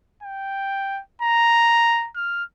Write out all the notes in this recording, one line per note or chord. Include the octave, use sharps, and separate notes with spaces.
G5
A#5
F6